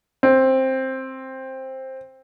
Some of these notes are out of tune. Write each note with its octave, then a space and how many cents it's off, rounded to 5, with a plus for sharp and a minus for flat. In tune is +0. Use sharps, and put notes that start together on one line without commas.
C4 +10